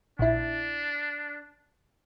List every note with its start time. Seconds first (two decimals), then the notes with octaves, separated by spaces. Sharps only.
0.19 A#1 D4 E4